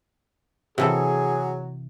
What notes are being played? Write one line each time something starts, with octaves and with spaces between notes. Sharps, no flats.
C3 E3 F#3 G#4 A4